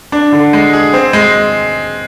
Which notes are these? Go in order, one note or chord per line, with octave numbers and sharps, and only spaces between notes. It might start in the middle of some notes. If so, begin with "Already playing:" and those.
D4
D3
G#3
G#4
C4
G#3